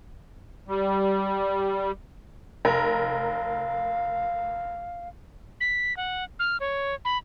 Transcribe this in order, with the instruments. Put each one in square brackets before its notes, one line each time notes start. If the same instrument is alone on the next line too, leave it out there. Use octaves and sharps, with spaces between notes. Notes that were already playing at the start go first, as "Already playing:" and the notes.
[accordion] G3
[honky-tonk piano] F1 A#4 [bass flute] F5
[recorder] B6
F#5
F6
C#5
B5